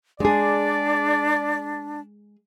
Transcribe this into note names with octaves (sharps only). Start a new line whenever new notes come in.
G#3 D4 G#4 D5